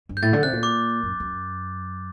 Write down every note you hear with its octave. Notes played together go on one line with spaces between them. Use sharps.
G2
G6
A2 A6
D3
C3 F#6
A#2
D6
F#2
F#2